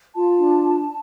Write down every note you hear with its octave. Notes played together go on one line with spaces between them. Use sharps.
F4 A5
D4